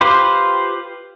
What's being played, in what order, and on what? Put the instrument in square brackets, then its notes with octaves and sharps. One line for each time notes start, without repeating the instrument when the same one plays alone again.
[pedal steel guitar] F4 G4 B4 C5